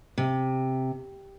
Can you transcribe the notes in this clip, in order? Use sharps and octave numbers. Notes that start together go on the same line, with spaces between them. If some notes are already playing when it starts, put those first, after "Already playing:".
C3